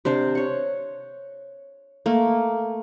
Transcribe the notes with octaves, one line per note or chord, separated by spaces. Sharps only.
C3 D4 C5
C#5 F#5
A3 A#3